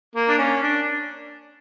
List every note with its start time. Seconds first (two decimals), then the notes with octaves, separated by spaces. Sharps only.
0.15 A#3
0.28 D4
0.38 C#4
0.62 D4